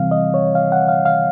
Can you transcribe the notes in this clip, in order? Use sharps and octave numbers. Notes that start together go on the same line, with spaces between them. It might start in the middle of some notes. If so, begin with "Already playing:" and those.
Already playing: C3 E3 G3 C4 F5
D#5
C#5
F5
F#5
F5
F5